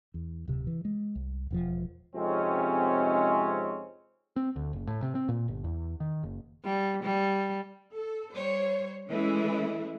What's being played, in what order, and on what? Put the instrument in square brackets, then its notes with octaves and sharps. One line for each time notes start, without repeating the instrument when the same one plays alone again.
[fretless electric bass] E2
D1 C3
E3
G#3
C2
E1 C#3 F3
[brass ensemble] F2 G#2 C3 G#3 C4 C#4
[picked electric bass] C4
D2
F#1
A2
C3
C4
A#2
G1
E2
D#3
F#1
[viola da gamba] G3
G3
[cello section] A4
G3 C5 C#5
E3 G#3 A3 C#4 E4